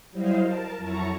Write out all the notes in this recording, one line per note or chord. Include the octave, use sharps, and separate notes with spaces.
F#3 G3 E4 C5 D#5 F5
A#4 A5
F2 F#3 E4 A5 A#5 C#6